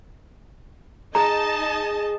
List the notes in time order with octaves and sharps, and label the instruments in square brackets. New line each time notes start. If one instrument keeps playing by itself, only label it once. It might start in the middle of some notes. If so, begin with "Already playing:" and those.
[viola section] D#4 D#5 A5 [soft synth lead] G#4 [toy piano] A#5